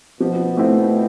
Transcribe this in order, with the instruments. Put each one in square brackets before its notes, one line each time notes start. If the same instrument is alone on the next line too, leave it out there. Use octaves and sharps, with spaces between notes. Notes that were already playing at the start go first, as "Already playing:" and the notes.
[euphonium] B2 [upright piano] F3
[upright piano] A3 C4 E4